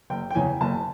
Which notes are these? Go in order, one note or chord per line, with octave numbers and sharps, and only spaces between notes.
F#1 G5
G5
E2 C#3 G#5
F#1 A5